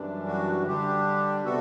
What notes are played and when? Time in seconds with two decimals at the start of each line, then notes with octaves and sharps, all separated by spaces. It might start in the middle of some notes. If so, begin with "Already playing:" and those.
Already playing: F#2 E3 G3 D4
0.28 F#4
0.66 D3 G3 D4 G4
1.44 C3 G3 B3 F#4 A4